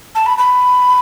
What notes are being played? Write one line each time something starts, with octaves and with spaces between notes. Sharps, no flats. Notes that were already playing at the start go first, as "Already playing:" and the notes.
A5
B5
B5